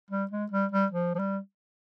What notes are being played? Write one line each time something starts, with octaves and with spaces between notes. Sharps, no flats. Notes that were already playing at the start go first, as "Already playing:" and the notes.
G3
G#3
G3
G3
F3
F3
G3